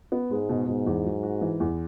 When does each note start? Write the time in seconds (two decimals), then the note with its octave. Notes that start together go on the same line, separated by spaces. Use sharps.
0.12 B3
0.31 G#2 G#3
0.49 B2
0.68 G#2 B2
0.87 E2
1.05 F#3
1.23 F#4
1.41 E3
1.60 E2